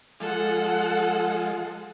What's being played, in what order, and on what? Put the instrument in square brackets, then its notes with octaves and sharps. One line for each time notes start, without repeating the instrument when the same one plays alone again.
[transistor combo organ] F3 G#3 [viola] A4 F#5